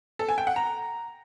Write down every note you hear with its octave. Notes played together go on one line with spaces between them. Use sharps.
A4
G#5
G5
F#5
A#5